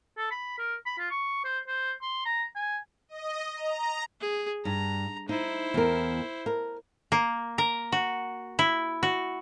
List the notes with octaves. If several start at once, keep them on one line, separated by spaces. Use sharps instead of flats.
A4
B5
A#4
B5
F4
C#6
C5
C5
C6
A#5
G#5
D#5
A#5
G#4
G2 A#5
D#4 E4 C5
E2 A#4
A#4
A#3
A#4
F#4
E4
F#4